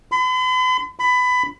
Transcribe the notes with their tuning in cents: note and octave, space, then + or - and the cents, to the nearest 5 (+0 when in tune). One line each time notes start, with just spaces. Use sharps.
B5 +45
B5 +20